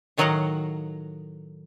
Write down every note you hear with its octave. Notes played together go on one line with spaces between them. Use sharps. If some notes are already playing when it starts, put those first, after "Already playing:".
A2 D#3 F#3 D#5 F5 F#5